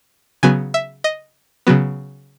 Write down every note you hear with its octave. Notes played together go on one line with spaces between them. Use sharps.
C#3 F#3 B3 G#5
E5
D#5
C#3 F#3 B3